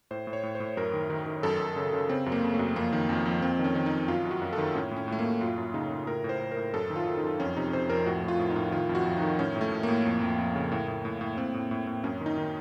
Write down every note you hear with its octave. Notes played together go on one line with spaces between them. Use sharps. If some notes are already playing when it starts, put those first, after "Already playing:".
A2 C5
A2
C#5
A2
C5
A2
F#2 A#4
D#3
D#3
D#3
F#2 A4
F#2
C#3
C#3
C#3 C4
F#2
A#3
C#3
A3
F#2
F2 A#3
D#3
F2
F2
F2 C4
D#3
C#4
D#3
D#4
D#3
F#2 F4
F#2
F#4
F#2
A4
D#3
A2 C#4
A2
C#4
A2 A3
A#3
A2
F#2 F4
F#2
C#3 D#4
C#3
A2 A#4
A2
C5
A2
A#4
A2
F#2 A4
D#3
F4
D#3
D#4
F#2
F2 C#4
C3 D#4
C3 C5
F2 A#4
A2 F#4
A2
F4
A2
D#4
A2
D#3 F4
F2
F#4
F2
D#4
D#3
A2 C#4
A2
A3
A2
A#3
A2
F2
F2
F2
C#3
A2
A2
A2
A2
A2 C4
A2
A2
A2
F#2 C#4
D#3
D#4
D#3